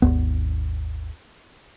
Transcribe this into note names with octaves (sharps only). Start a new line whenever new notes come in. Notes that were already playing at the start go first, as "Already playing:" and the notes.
G#1 D#2 B3